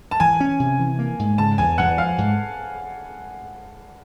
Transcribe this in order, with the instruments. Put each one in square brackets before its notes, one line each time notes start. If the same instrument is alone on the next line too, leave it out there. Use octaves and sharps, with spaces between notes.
[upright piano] A5
[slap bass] E3 [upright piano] G#5
[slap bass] C#4
C3
E3
A#3
G#2
[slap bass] C#3 [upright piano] A5
[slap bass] E2 [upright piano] G#5
[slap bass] E2 [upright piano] F#5
[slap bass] F3 [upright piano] F5
[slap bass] G#2